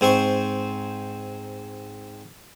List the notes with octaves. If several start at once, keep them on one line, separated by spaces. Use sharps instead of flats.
G#2 C4 C5 C#6